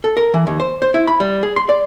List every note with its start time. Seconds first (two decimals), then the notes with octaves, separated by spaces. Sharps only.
0.04 A4
0.17 A#4
0.34 E3
0.47 D#2
0.60 C5
0.82 C5
0.94 E4
1.07 B5
1.20 G3
1.43 G#4
1.56 C6
1.69 D5